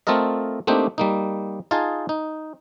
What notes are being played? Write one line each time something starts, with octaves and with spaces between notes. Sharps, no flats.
A3 C4 F4 A4 A#4 D#5
A3 A#3 C4 D4 D#4 G4
G3 A#3 D#4
D#4 F4 G#4 F5 G#5 A5
D#4